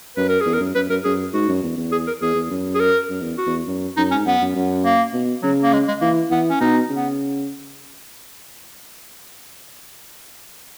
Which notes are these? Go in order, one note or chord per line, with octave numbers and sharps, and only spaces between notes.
F#2 B4
A#4
G#4
E2
A#4
F#2
F#2 B4
F#2 A#4
F#2 G#4
G#2 F#4
F#2
E2
E2
G#4
A#4
E2 G#4
E2
F#2
G#4
A#4
F#2
E2
F#4
E2
F#2
F#2 D#4
C#4
G#2
F#2 B3
F#2
F#2
A#3
B2
C#3 F#3
A#3
G#3
G#3
E3 A#3
E3 B3
C#4
B2 D#4
C#3
B3